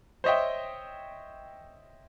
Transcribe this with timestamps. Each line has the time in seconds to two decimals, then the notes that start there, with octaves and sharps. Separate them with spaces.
0.24 C5 C#5 D#5 E5 G5